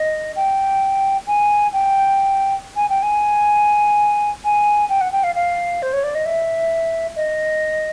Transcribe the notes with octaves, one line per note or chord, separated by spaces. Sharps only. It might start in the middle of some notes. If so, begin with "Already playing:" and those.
Already playing: D#5
G5
G#5
G5
G#5
G5
G#5
G#5
G5
F#5
G5
F5
F5
C5
C#5
D5
D#5
E5
D#5